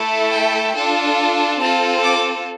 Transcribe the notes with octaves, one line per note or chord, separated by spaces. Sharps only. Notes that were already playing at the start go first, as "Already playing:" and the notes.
Already playing: A3 E4 A4
G5
D4 F4 A4
C4 F4 A4 A5
D6